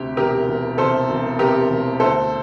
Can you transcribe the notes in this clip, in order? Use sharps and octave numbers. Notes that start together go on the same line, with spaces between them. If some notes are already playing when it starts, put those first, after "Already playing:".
Already playing: D2 C3 G4
E1 G4 A#4
E1
C3 A4 C5
E1
C3 G4 A#4
E1
D2 A4 C5